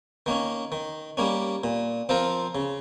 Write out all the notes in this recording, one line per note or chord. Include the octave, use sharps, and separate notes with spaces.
D#3 A#3 C#4
D#3
G3 A#3 C#4
A#2
F3 C4 F4 A#4
C#3